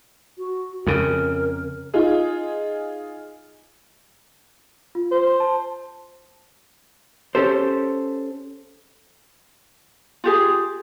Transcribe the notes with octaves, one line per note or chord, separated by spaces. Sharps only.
F#4
F2 C#3 A#4
D#4 F4 G#4
F4
C5
A5
C#4 G4 A4 C5
F4 G4 G#4